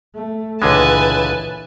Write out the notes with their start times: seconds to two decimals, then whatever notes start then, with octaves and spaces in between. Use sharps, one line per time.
0.14 A3
0.62 C#2 A#2 D3 E3 G#3 B4 G#5 A5